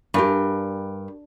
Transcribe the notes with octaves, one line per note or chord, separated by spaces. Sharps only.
G2 G4 A#4 G#5